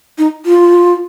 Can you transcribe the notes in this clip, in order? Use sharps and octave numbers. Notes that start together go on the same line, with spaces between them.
D#4
F4